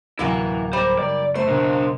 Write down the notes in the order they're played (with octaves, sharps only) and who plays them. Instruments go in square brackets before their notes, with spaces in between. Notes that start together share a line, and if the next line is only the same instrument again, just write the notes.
[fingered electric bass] D1 C2 F#3 [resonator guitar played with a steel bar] C3 A#3 F#4 [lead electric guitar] E3 E4
[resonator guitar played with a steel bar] G3 A#3 [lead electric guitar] C5
[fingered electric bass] F#1 [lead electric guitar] D5
[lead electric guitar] A3 [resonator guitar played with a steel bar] C5
[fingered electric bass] F#1 B2 [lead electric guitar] D4 A#4